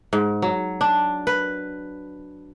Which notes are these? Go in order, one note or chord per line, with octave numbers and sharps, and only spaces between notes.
G#2
F#3
D4
B4